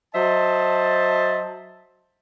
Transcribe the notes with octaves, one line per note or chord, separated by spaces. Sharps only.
F#3 C5 D#5 E5 A5